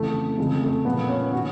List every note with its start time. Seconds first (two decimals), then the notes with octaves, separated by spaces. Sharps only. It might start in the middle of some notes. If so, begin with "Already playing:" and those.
Already playing: F2 C#3 E3 A3
0.38 F2 C#3 E3 G#3
0.62 A3
0.85 A#2 F3 B3
1.09 C#4
1.33 D#3 F#4